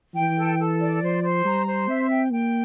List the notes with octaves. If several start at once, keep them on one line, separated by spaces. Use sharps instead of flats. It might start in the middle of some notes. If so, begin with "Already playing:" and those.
E3 G5
A4
A4
D5
F3 C5
C5
G3 A#5
C5
C4 E5
G5
A#3 G5